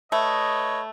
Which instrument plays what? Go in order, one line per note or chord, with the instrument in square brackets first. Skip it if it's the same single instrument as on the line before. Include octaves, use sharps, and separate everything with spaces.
[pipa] A3 [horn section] B4 C#5 D#5